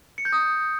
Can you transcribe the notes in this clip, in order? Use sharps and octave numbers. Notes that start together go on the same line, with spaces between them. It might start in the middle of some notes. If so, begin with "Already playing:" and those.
C#7
G6
D#6